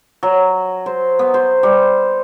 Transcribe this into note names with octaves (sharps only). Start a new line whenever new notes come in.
F#3
C5
B3
C5
G3